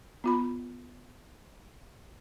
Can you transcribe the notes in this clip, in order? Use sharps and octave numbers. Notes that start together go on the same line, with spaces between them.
B3 F4 B5